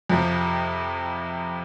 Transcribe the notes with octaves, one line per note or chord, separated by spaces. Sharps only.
F2 C3 F3